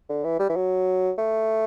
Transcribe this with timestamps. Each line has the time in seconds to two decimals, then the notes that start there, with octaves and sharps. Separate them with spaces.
0.09 D3
0.24 E3
0.40 G3
0.49 E3
0.56 F#3
1.18 A3